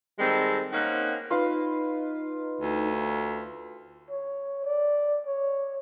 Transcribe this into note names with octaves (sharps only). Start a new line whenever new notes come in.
D#3 G3 G#3 C4 A4
A#3 C4 C#4 D#4 F#5
D#4 F4 B4 F5
D2
C#5
D5
C#5